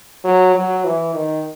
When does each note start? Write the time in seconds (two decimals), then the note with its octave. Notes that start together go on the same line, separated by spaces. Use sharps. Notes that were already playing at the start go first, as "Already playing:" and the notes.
0.24 F#3
0.54 F#3
0.84 E3
1.14 D#3